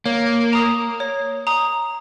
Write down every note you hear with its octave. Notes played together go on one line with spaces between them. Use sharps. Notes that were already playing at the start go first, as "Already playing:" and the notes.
A#3 C#5
A#5 D#6
C#5
A#5 D#6